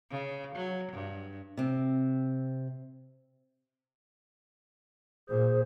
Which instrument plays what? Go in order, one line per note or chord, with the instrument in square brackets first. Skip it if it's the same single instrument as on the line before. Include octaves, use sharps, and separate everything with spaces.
[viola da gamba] C#3
F#3
G2
[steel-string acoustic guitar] C3 C4
[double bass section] A#2 [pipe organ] G#4 C5